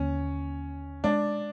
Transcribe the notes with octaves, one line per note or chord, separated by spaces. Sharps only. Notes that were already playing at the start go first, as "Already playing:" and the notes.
Already playing: D#2 D3 A#3 C#4
G#3 D4